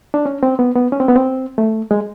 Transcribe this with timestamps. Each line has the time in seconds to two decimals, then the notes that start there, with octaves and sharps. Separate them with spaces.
0.14 D4
0.26 C#4
0.43 C4
0.59 B3
0.75 B3
0.92 C#4
1.00 C4
1.08 B3
1.16 C4
1.58 A3
1.91 G#3